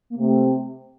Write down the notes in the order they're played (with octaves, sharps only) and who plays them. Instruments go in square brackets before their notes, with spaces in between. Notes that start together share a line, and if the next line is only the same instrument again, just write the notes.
[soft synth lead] A#3
[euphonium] C3 [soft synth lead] A3